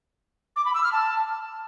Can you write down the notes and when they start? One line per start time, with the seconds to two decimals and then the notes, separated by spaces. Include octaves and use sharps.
0.56 D6
0.65 B5
0.74 E6
0.83 F6
0.92 A5